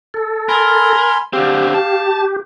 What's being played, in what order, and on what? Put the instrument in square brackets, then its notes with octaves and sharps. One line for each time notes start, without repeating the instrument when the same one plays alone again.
[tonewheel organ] A4
[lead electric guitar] A#4 [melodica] G#5 B5 C6
[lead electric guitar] D3 C4 [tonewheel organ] G4 [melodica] F5
[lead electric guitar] A5